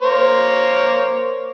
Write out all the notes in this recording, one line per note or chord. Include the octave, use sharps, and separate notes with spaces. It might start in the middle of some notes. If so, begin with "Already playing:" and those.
A#3 C5 C#5